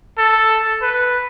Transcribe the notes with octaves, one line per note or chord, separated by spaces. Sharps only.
A4
B4